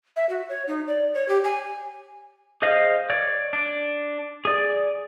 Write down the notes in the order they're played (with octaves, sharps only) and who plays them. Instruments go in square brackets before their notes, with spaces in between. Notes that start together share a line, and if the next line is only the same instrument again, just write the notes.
[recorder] E5
F#4
C#5
D#4
D5
C#5
G4
G#5
[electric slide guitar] G#4 C5 D#5 F5
C#5 D5
D4
G#4 D5